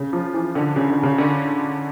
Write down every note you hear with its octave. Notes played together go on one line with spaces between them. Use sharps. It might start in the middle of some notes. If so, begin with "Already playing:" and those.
Already playing: C#3
F3
E3
D3
C#3
D3
C#3
D3